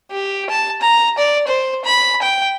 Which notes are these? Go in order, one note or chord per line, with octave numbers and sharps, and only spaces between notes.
G4
A5
A#5
D5
C5
B5
G5